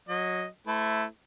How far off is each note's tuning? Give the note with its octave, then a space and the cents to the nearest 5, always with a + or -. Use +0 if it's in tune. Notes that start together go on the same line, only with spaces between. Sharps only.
F#3 -20 D#5 +0
A3 +0 E4 +0 C5 -35